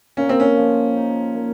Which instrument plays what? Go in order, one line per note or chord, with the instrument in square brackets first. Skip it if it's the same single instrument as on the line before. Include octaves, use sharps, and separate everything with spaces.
[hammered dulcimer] A#2 [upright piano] C#4
[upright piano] C4
C#4
[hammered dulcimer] F3
D#4
A#3